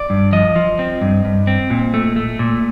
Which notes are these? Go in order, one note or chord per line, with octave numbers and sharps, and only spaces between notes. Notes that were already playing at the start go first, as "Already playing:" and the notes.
Already playing: D5
G2
F3 D#5
F3
C4
G2
G2
C4
A#2
A3
A3
A#2